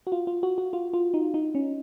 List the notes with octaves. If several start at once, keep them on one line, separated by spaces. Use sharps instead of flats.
F#4
F4
F4
F#4
F#4
F4
F4
D#4
D#4
C#4